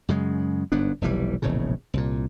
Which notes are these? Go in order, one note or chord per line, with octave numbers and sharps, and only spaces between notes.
F#2 C#3 G#3
G1 G#2 B3 D4
F1 B1 E3 G3
E1 A#1 A2 C#3
C2 A#2